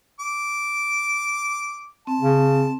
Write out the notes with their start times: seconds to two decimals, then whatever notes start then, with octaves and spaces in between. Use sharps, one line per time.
0.20 D6
2.07 C4 A5
2.21 C#3